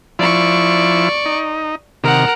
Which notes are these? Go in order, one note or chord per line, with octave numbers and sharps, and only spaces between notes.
F3 E4 D5 C#6
D#4
C3 D#3 A#4 F#5